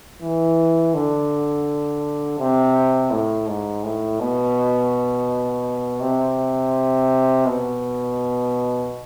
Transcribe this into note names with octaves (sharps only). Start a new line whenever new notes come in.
E3
D3
C3
A2
G#2
A2
B2
C3
B2